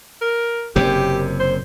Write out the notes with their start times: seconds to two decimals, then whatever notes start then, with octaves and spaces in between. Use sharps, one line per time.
0.21 A#4
0.76 F#1 F#2 C3 G4
1.39 C5